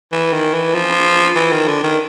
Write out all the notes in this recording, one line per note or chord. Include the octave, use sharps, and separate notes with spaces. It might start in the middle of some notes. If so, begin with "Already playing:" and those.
E3
D#3
E3
F3
E3
D#3
D3
D#3